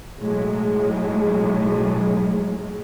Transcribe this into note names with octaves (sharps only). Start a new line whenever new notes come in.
B1 A2 F#3 G#3